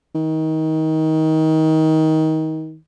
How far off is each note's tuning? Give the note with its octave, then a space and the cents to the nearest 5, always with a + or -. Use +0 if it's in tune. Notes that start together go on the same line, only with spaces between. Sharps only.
D#3 +25